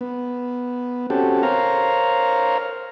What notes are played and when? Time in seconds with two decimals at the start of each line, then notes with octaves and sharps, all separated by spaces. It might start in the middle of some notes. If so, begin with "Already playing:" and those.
0.01 B3
1.10 C4 C#4 F#4 G4 A4
1.43 A#4 C5 C#5 F5 A#5